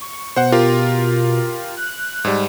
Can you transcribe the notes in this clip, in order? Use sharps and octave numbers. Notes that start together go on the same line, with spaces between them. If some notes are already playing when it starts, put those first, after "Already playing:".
C#6
B2 C5 F#5
F4 G4 A#4
F#6
G#2 G3